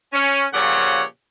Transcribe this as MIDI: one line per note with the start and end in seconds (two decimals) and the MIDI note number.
0.13 0.45 61
0.54 1.03 46
0.54 1.03 49
0.54 1.03 53
0.54 1.03 67
0.54 1.03 73
0.54 1.03 78